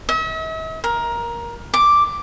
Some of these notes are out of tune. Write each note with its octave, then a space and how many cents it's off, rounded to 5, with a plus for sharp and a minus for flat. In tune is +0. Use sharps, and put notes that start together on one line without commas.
E5 -45
A#4 +15
D6 +0